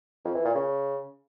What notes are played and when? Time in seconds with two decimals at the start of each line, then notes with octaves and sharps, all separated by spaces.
0.25 F2
0.35 E3
0.45 A#2
0.54 C#3